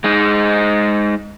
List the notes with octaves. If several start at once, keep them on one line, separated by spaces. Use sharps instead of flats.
G#3 D#4